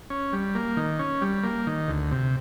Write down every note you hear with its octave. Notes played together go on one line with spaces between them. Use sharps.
C#4
G3
A#3
D#3
C#4
G3
A#3
D#3
D2
C3